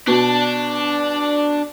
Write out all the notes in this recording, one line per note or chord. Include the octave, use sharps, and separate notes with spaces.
B2 D4